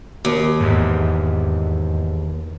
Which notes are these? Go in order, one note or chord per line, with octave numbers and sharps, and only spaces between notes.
D#2
E2 G#2